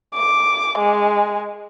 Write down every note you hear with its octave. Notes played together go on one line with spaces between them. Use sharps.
D6
G#3